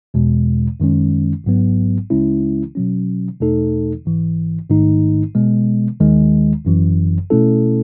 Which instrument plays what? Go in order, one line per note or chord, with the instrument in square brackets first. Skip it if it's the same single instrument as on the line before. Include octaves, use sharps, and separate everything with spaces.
[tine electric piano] E2 B2 G#3
F#2 D#3 G#3 C#4
A1 G#2 F#3 B3
C#2 C#3 G#3 C#4 E4
B2 F#3 C#4
E2 B2 A3 D#4 A4
A1 G#2 E3
A1 G#2 D#3 A3 D#4
B2 G#3 B3
D#2 D#3 G#3
G#1 F#2 E3
B2 A3 C#4 E4 A4